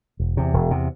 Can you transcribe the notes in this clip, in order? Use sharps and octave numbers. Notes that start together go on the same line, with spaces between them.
E1
E2 C3
E1
E2 C3